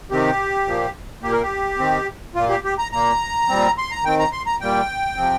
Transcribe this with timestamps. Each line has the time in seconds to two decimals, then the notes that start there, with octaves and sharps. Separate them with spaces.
0.11 C3 D#3 C4 G4
0.66 A#2 F3 A#3
1.22 A#2 A#3 G4
1.32 A#4
1.42 G4
1.79 D#3 C4
2.35 A#2 A#3 F4
2.49 G4
2.64 G4
2.79 A#5
2.92 A#2 A#3 A#5
3.49 A#2 G3 C4
3.78 C6
3.91 A#5
4.04 D#3 C4 G5
4.19 A#5
4.32 C6
4.46 A#5
4.61 A#2 G3 A#3 G5
5.17 C3 F3 C4